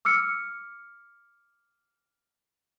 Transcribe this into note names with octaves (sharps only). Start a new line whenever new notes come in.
D6 E6 F6 C#7